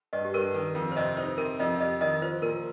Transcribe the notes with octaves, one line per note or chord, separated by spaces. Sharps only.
G2 D#5
G4
G2 A#4
D#3
F2
C5
C3 D#5
D#4 C5
C3 A#4
F2 D#5
G4 D#5
D#3 D#5
F3 C5
A#2 A#4